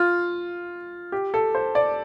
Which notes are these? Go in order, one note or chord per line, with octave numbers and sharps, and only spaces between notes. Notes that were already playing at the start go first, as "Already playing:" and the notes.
Already playing: F4
G4
A4
C5
D5